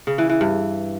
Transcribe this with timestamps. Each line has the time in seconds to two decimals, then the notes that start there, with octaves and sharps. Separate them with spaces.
0.07 C#3
0.18 E3
0.30 E3
0.41 G2